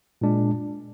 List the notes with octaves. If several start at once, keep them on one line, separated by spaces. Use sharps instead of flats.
A#2 G#3 D4